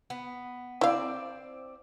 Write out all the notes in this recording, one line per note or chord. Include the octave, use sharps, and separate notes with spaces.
B3
C4 E4 D5 F5